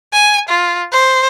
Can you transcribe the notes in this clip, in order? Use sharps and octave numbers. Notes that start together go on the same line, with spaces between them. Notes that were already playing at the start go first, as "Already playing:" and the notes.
G#5
F4
C5